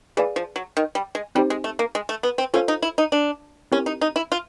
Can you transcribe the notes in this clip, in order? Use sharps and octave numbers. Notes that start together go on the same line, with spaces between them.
E3 G#4 B4 D5 F5 G#5
F3
F#3
D#3
G3
G#3
G3 C4 D#4 G4 C5
G#3
A3
A#3
G#3
A3
B3
C4
C#4 F4 A4 C5 F5
D#4
E4
D#4
D4
C4 C#4 E4 G4 A#4
D#4
D#4
E4
F4